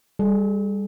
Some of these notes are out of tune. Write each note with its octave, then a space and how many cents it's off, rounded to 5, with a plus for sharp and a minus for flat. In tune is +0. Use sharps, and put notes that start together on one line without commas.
G3 +25 A4 -45